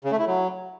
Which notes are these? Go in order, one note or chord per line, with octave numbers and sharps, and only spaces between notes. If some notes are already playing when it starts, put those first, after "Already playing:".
C#3
A3
E4
F#3